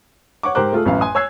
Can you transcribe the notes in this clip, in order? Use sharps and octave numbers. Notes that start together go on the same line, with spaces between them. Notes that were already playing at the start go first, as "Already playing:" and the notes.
C#5 F#5 C#6 D6
G#2 G4 A#4 C5 D6 F#6
A3 F4 G#4 A4
A1 F#2 F5
G#5 C6 D#6
C#5 G#5 E6 F#6 G#6 C7